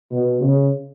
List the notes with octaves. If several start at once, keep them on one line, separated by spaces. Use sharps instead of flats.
B2
C#3